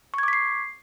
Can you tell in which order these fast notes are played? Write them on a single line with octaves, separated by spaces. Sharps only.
C#6 G#6 D6 B6 C7